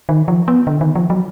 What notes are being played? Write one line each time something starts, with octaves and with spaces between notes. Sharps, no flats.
D#3
F3
B3
D3
D#3
F3
F#3